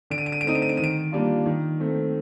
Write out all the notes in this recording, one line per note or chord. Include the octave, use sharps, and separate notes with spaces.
D3 D7
D#7
D7
D#7
D7
A3 C4 D#4 D#7
D7
D#7
D7
D#3 D#7
D7
G3 A#3 D4 F4
D#3
A3 C4